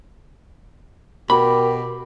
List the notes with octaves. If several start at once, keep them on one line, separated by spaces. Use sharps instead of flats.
B2 G4 A#4 B5